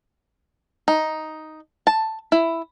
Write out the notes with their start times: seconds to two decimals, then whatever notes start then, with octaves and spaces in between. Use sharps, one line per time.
0.88 D#4
1.87 A5
2.32 E4